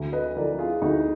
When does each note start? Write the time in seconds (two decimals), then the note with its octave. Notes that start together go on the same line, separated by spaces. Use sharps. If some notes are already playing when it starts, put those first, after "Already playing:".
Already playing: D2
0.12 B4 D#5
0.36 D3 F3 A#4 D5
0.59 F4 G#4
0.82 D2 D#4 F#4